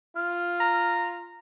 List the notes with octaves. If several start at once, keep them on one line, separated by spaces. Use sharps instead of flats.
F4 F6
A#5